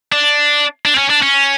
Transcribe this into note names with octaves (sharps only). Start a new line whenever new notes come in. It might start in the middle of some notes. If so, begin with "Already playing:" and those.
D4
D4
C4
C#4
D4
C#4